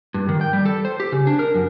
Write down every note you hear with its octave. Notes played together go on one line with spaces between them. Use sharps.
G2
D#3
G5
G3
A4
C5
G4
C#3
D4
A#4
F#2